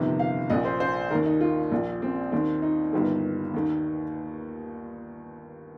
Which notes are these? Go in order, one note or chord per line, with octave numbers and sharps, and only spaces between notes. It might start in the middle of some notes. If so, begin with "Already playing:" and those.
Already playing: G1 F2 C3 D#3
F5
A#1 A#2 D#5
C5
C5
D#2 D#3 A#4
D#4
F4
A#1 A#2
C4
D#2 D#3 C4
D#4
G1 G2 D#3
D#2 D#3